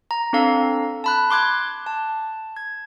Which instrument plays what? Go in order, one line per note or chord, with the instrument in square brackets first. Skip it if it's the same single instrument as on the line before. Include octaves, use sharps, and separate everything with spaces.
[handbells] A#5
C4 D4 A4 F5 A#5
A5 B5 F#6
C6 D6 F#6 G#6
A5
G#6